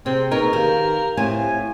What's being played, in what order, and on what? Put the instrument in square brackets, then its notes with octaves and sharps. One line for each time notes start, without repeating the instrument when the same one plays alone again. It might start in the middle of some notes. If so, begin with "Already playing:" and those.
[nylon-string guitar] C3 [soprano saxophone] C4 [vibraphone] G#4
[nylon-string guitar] B2 D#4 [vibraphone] A#3 G#4 C#6 [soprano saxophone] A#4
[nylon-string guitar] D#3 [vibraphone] G4 F5
[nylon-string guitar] A2 A3 C4 [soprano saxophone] G#5